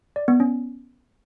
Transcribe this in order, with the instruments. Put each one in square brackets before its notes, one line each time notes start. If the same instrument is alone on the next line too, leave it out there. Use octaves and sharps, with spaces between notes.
[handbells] D5
B3
C#4